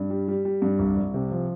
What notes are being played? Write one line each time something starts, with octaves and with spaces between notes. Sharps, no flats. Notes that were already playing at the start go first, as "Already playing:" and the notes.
Already playing: G2
G3
G3
G3
G2
C2
C2
C3
F3